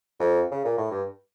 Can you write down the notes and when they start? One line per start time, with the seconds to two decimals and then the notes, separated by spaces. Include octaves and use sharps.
0.19 F2
0.51 C#3
0.65 A#2
0.78 A2
0.91 G2